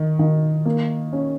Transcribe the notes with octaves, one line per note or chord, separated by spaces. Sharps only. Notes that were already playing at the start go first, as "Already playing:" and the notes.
Already playing: D#3
D#3
A#3
C#4